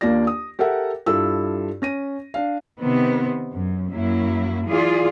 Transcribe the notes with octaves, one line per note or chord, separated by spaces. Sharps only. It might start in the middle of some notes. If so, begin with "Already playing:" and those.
D#2 A#3 D4 F4 D5 A#6
D#6
G4 A4 A#4 E5 F#5
G2 E4 F4 A4 E6
C#4 A#6 D#7
D4 F5
C3 D#3 B3 C4
F#2
F#2 F#3 A#3 E4
E3 F4 G#4 D5